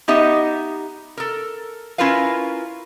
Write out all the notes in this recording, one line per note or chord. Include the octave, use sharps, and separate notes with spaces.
B3 D#4 G4 D#5 E5
A4 A#4
C#4 E4 F4 A#4 B4 F5